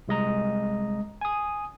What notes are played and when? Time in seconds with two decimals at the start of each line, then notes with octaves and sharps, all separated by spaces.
0.08 C2 G#3 D#5 A#5
1.21 G#5 D#6